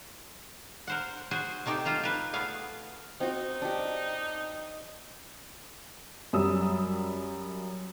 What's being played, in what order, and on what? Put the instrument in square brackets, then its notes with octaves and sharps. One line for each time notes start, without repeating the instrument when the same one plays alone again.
[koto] A#4 C5 F#5
F#4 G#4 C5
C3 A3 D#4 G4
G#3 F4 C5 A#5
A#4 B4
A3 B3 G#4 F5
[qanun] C4 F#4 [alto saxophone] D#4
[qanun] D4 G4
[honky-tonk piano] F#2 G3 D#6 E6